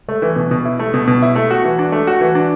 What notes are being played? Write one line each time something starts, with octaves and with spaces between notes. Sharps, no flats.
A3
E3
B2
B2
E4
A3
B2
B2
E4
A3
F#4
E3
D4
A3
F#4
E3
D4